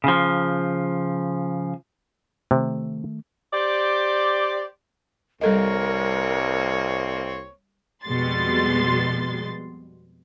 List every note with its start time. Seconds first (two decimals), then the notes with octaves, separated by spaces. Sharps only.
0.04 C#3 F3
2.51 C3 D#3 A3
3.53 G4 C5 D5
5.41 C2 G3 A#3 C4 A4 A#4 C#5 D#5
8.04 F2 B2 G3 G#3 C6 A6